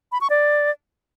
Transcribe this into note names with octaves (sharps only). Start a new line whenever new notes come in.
B5
C#6
D5